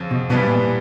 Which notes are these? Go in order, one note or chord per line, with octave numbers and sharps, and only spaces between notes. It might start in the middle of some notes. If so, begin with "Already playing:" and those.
Already playing: F2 C#3 F3
B2
G2 B2 E3 G3 B3 D4
A#2